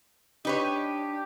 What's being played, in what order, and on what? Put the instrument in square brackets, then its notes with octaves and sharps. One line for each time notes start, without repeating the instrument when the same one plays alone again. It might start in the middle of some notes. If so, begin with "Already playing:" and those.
[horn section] D4 G4 [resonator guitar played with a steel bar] D#4 B4 C#5